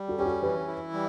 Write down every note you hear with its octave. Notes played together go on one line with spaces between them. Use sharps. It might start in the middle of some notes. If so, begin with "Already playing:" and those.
Already playing: G3
F#4 A4
C#4 G4
F#4 A4
E3 G4 B4
E4
G3